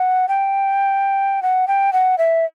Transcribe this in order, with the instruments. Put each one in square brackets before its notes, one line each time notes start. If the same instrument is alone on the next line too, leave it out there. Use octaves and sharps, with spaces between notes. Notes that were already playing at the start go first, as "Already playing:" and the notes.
Already playing: [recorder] F#5
G5
F#5
G5
F#5
E5